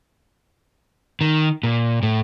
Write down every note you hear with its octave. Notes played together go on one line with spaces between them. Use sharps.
D#3
A#2
A2